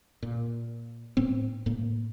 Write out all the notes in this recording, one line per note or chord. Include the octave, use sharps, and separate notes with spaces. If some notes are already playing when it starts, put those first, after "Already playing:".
A#2
A2 B3 C4
A2 A#3